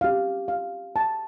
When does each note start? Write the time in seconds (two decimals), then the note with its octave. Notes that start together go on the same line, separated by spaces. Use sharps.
0.01 C#4 G4 F5
0.48 F5
0.96 A5